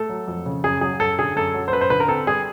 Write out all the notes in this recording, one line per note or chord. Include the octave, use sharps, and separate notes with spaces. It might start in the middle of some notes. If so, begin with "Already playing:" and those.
Already playing: A3 A4
F#3
F2
C#3
F#2 G#4
F#3 G#4
F#2 A4
D3 G#4
F#2 A4
F#3
C5
F#2 B4
C5
D3 B4
A#4
C4 A4
G3 G#4